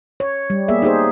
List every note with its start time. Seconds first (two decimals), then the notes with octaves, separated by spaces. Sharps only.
0.20 C#5
0.50 G3
0.68 A#3 B3 G#4 E5
0.82 D#4 G4 G#4 C5